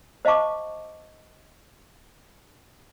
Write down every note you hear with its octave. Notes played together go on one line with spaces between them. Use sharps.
C5 D#5 F5 A5 C#6 D6